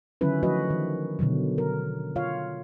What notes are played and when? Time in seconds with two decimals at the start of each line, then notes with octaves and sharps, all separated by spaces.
0.21 D3 D#3 F#3 C#4 E4 B4
0.43 F3 A3 F#4 B4 D#5
0.70 D#3
1.19 B2 D3 D#3 F#3
1.58 A#4
2.16 F4 C#5 F5